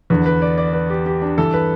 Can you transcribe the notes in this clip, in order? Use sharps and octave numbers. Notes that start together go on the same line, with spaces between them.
E2 D3 B4
B4
D5
D5
B4
G4
G4
D4
G2 E3 A4
B4